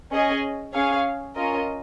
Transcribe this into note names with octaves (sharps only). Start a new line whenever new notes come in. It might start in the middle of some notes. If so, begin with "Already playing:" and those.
C#4 G#4 D#5
C#4 G#4 C#5 F5
C#4 F4 A#4 D#5